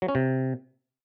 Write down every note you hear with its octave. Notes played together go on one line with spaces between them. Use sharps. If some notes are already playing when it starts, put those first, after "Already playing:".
F#3
C#4
C3